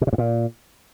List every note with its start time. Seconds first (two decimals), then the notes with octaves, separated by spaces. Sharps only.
0.01 B2
0.07 C3
0.13 G2
0.18 A#2